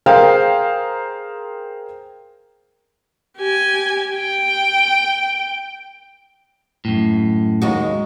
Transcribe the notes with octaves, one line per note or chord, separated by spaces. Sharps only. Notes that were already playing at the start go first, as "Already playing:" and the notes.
G#4 A#4 C5 F5 G5
G4 G#5
G5
F#2 A2
D#2 G#3 F#4